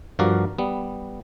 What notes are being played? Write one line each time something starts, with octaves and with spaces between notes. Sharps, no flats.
G2 F3 F#4 A#4 D5 F5
G3 B3